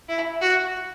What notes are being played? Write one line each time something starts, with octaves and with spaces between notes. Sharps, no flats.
E4
F#4